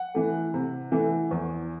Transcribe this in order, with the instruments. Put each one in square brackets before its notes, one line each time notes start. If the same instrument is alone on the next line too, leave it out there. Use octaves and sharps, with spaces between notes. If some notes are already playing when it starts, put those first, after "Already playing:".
Already playing: [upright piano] F#5
E3 A3
C3
E3 A3
E2